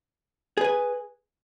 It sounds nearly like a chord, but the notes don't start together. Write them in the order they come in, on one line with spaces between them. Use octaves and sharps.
G#4 B4 G#5